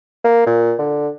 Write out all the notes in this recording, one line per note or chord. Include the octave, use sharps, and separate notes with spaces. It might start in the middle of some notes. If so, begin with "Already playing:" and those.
A#3
A#2
D3